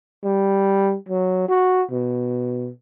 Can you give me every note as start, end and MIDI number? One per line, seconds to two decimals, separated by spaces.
0.24 0.96 55
1.09 1.48 54
1.48 1.83 66
1.91 2.69 47